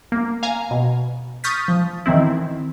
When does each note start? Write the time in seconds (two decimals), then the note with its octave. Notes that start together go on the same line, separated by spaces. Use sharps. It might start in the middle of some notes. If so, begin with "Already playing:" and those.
0.12 A#3
0.43 F5 G#5 A#5
0.71 B2
1.44 C#6 D#6 F6 G6 A6 B6
1.68 F3
2.06 D#3 E3 C4 E4